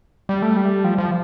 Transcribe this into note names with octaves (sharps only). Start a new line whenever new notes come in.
G3
A3
G3
F3
F3